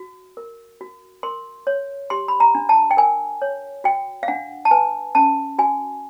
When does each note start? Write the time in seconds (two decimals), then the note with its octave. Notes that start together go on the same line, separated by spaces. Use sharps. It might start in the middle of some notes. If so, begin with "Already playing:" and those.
Already playing: F#4
0.37 A#4
0.81 F#4
1.23 A#4 C6
1.67 C#5
2.10 G4 C6
2.28 B5
2.40 A#5
2.55 D4
2.69 A5
2.91 G5
2.97 A#4 G#5
3.42 C#5
3.84 F#4 G5
4.23 F5
4.28 D4 F#5
4.65 A5
4.71 B4 G#5
5.15 C#4 A5
5.58 F#4 G#5